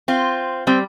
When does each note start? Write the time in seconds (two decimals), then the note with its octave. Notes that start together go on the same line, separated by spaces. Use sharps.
0.08 C4 F4
0.67 G3 C4